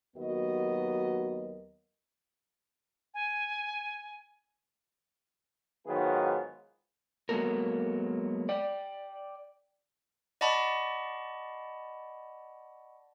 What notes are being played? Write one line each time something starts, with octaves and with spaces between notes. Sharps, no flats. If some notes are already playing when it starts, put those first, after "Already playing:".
D#2 F#3 B3 F#4 A#4 D#5
G#5
G#2 D#3 F#3 B3 F4 G#4
F#3 G#3 A#3 B3 A4 A#4
D5 G5
D5 D#5 F#5 A5 B5 C#6